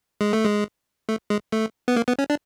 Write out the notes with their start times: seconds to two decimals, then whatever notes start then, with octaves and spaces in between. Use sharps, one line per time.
0.21 G#3
0.33 A3
0.45 G#3
1.09 A3
1.30 G#3
1.52 A3
1.88 B3
1.96 A#3
2.08 B3
2.19 C#4
2.30 D4